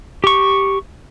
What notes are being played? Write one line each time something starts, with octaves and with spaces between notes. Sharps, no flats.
G4 C#6